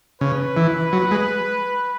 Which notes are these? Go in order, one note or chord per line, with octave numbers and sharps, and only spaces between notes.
C#3 B4
E3
F#3
G#3